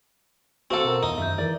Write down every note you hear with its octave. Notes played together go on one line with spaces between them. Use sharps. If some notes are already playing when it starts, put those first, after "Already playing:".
C4 F#4 A4 F5 F#5
B2 A#4
E2 D#4
F#2 D#3 E5 G6
E3 A#4 D5